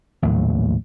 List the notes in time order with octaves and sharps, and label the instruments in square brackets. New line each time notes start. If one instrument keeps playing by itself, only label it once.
[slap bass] A#1 D#2 A2 F#3